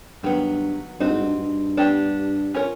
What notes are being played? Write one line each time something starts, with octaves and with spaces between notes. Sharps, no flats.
G2 D#3 F#3 B3
G2 C4 D#4 F#4
G#2
G2
G2
B3 D4 G4
C#4 F4 A#4 C#5